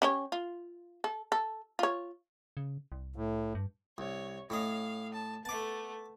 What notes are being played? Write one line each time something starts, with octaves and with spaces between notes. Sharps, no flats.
C#4 G4 C#5
F4
A4
A4
F4 C#5
C#3
C2
A2
G2
C2 C#5
A2 C#4 D#5 F5
A5
A3 B3 A5 D6